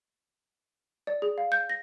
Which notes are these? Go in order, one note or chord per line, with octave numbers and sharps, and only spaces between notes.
D5
G#4
F5
G6
A#6